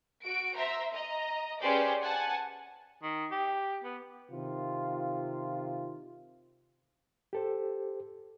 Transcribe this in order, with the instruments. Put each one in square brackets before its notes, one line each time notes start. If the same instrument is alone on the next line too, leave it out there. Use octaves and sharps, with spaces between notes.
[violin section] F#4 D7
C5 E5 A#5
D#5 A#5
C#4 G4 G#4 B4 C5 D5
F#5 G#5 A5
[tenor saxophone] D#3
G4
B3
[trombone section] C3 D#3 F4
[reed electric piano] G4 A4 C5